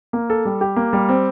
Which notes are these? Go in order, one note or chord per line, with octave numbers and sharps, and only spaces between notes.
A#3
A4
G3
G4
A#3
G3
C4